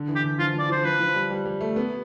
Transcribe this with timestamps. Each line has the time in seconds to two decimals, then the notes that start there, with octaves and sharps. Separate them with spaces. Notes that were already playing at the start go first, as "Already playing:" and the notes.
Already playing: D3
0.08 E3
0.16 G4
0.24 D3
0.39 F3 F4
0.54 F3 D5
0.69 F3 C5
0.85 F3 B4
1.00 F3
1.15 G3
1.30 G3
1.46 G3
1.61 A3
1.76 B3